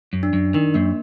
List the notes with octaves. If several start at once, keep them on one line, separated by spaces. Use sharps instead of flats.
F#2
D4
F#2
D#3 D4
F#2 A#3